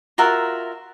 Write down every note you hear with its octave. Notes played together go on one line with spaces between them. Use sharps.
F4 F#4 A#4 E5